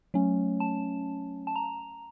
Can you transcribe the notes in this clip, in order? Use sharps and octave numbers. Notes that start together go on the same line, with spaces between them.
F#3 A3 C#4
A5
A5
A#5